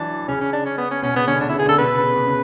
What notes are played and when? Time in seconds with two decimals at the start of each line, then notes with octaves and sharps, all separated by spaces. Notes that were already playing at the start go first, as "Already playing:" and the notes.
Already playing: E3 F#3 D4
0.28 C#3 C#4
0.41 C#4
0.53 D4
0.66 C#4
0.78 B3
0.91 C#4
1.02 B2 C#4
1.15 C#3 B3
1.27 D3 C#4
1.40 B2 D4
1.49 C#3 E4
1.59 G#4
1.66 D3 A4
1.78 B2 B4
1.97 C#3
2.16 B2
2.26 C#3